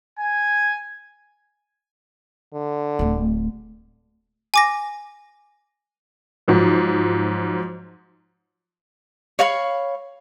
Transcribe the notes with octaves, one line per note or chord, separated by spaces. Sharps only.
G#5
D3
D1 A3
G#5 D6 A#6
G#2 F3 F#3
C#5 F5 B5 C#6